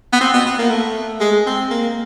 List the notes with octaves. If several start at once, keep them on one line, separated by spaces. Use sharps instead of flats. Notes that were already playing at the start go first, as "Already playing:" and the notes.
B3
C4
B3
B3
A#3
A3
G#3
C4
A#3